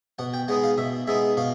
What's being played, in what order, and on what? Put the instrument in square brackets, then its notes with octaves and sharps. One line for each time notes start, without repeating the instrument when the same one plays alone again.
[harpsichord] B2 F#5
G5
G#3 B3 D#4 F#5
F5
B2 E5
G#3 B3 D#4 E5
B2 F5